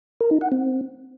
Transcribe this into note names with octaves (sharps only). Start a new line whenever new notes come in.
A#4
D#4
F#5
C4